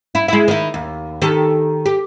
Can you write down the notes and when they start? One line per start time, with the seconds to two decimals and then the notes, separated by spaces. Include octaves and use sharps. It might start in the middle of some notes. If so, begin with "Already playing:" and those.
0.15 E4
0.28 G#3 E4
0.48 D#3 E4
0.74 D#2
1.22 D#3 G4 A4
1.86 G4